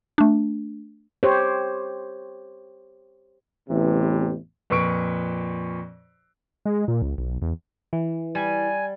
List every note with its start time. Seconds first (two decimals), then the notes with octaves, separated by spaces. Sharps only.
0.18 A3 D4
1.23 G4 C5 C#5
3.69 A1 E2 C3 E3
4.70 F2 A#2 B4 C#6 D7
6.66 G#3
6.88 A#2
7.02 C#2
7.18 B1
7.42 E2
7.93 E3
8.35 G3 G#5